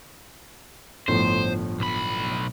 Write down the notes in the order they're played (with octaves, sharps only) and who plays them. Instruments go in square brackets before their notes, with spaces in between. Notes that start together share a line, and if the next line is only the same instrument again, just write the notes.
[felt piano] G1 A2 F3 [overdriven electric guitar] C5
[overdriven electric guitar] B1 B5